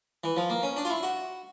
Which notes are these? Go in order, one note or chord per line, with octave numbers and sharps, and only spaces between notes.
E3
F3
A#3
C#4
D4
F4
E4
F#4